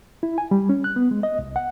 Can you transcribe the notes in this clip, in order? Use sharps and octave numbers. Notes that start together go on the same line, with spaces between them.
E4
G#5
G3
C#4
F#6
B3
G#3
D#5
C2
F#5